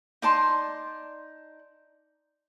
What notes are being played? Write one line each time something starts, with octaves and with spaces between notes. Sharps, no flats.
D#4 D5 A5 C6